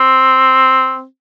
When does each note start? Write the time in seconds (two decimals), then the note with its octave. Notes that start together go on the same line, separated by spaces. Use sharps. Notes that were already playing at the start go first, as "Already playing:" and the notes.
Already playing: C4